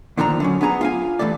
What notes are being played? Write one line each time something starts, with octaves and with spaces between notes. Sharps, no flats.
A#2 D3 D#3 F3 D4 A#5
D3 F#3 C#4
B3 D4 G#4 A#5
F4 F5 G#5
G2 E3 A3 A4 D5